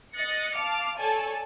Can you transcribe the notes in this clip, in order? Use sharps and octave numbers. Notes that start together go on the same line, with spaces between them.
D#5 F#6 A6 A#6 C#7
F5 A5 D6 F6
A4 C#5 D5 G#5 A5